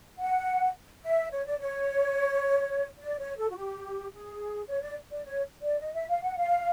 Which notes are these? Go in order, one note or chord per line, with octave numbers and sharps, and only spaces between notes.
F#5
E5
C#5
D5
C#5
D5
C#5
A4
F#4
G4
G#4
C#5
D5
D5
C#5
D5
D#5
E5
F5
F#5
F5